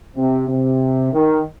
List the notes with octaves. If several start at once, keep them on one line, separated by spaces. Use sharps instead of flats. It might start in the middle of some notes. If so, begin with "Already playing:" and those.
C3
C3
D#3